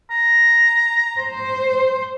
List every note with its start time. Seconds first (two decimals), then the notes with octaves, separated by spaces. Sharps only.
0.11 A#5
1.18 C5